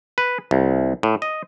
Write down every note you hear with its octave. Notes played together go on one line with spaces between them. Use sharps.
B4
C2
A2
D#5